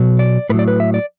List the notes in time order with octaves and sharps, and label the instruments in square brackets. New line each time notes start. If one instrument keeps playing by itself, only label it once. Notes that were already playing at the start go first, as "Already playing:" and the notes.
Already playing: [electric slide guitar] B2 F#3
D5
A2 B4
F#3 D5
B4
E5
D5